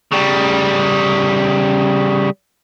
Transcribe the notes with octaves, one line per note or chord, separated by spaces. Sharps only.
C#3 G3